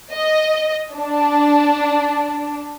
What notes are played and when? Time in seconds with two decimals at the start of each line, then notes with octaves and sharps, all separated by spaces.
0.13 D#5
0.95 D4